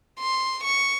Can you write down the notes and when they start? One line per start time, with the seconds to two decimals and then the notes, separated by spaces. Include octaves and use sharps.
0.20 C6
0.64 C#6